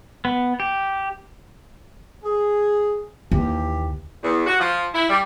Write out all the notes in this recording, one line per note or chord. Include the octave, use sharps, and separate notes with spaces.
B3
G4
G#4
D#2 E3 G4
E2
F#4
F3
E4
G3